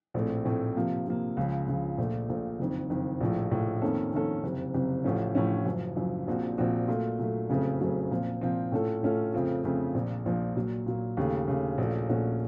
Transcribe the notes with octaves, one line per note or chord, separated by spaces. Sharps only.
A#1 A2 A3 C4
A#1 A2 A3 C4
C3 F3 A#3
C3 F3 A#3
C#2 C#3 F3
C#2 C#3 F3
A#1 A#2 A3
A#1 A#2 A3
F#1 F2 D#3
F#1 F2 D#3
A#1 A2 F3
A#1 A2 F3
F2 D#3 A#3 C#4 A4
F2 D#3 A#3 C#4 A4
F#1 F2 C3
F#1 F2 C3
A1 A2 F3 A3 C#4
A1 A2 F3 A3 C#4
F#1 F#2 F3
F#1 F#2 F3
A#1 A#2 F3 C4 F#4
A#1 A#2 F3 C4 F#4
A#2 F#3 A3
A#2 F#3 A3
F#1 F2 C#3 F#3 A3
F#1 F2 C#3 F#3 A3
A#2 F3 C4
A#2 F3 C4
A2 A3 C#4 F4 A4
A2 A3 C#4 F4 A4
F2 C#3 A3 C4 F4
F2 C#3 A3 C4 F4
A#1 A#2 F3
A#1 A#2 F3
A#2 F#3 A#3
A#2 F#3 A#3
D#2 C#3 A3
D#2 C#3 A3
A#1 A#2 A3 C#4 F#4
A#1 A#2 A3 C#4 F#4